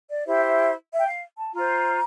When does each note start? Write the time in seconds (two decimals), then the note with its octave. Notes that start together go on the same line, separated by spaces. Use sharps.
0.10 D5
0.26 E4 G4 C5 E5
0.47 E5
0.91 E5
0.99 G5
1.06 F5
1.38 A5
1.54 F4 C5 A#5